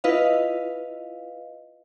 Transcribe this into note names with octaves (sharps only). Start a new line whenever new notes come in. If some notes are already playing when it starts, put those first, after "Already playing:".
E4 F4 B4 D#5 F5